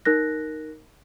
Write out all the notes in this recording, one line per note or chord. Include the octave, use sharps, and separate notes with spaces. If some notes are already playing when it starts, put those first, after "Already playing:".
D#4 A#4 F#6 A#6